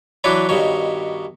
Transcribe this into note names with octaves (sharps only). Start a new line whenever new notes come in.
E3 F#3 D4 B4 C#5
G2 B2 D#3 C#5